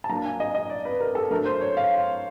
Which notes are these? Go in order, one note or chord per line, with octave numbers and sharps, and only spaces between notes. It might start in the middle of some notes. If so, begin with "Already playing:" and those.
A5
F#3 A#3 D4 A#5
G#5
D#5
D#5
D5
B4
A#4
A4
F#3 A3 D4 A#4
C5
C#5
F5